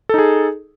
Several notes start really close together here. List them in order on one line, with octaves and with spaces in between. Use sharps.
A4 D#4 G#4